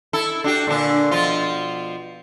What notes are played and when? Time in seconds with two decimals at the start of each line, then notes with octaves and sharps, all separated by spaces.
0.13 E4 A4
0.44 D4 F#4 G4
0.67 A#2 D3 D4
1.11 B2 F3 F4